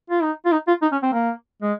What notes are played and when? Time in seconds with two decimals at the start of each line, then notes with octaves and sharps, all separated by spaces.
0.10 F4
0.22 D#4
0.46 F4
0.52 D#4
0.68 F4
0.82 D#4
0.92 C#4
1.03 C4
1.13 A#3
1.62 G#3